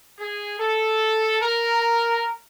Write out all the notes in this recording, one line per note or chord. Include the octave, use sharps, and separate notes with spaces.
G#4
A4
A#4